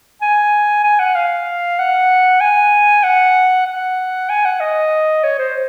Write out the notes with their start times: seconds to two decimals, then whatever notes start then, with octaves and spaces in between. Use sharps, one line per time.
0.22 G#5
0.84 G#5
1.00 F#5
1.15 F5
1.79 F#5
2.41 G#5
3.04 F#5
3.67 F#5
4.30 G#5
4.46 F#5
4.60 D#5
5.23 C#5
5.39 C5